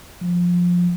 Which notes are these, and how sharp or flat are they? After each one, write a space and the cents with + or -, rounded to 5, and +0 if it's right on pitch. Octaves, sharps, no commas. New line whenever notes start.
F3 +15